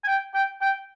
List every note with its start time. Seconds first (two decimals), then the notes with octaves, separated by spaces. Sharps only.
0.04 G#5
0.07 G5
0.34 G5
0.61 G5